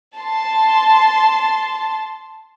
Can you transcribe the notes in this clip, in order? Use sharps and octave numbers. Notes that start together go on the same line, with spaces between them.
A5 C6